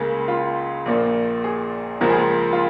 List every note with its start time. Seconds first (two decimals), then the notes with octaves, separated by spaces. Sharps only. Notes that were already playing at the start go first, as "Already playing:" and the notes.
Already playing: C#2 C#3 A#3 G#4
0.28 F4
0.86 A#1 A#2 A#3
1.44 G#4
2.01 C#2 C#3 F3 A#3 A#4
2.10 G#4
2.19 A#4
2.53 F4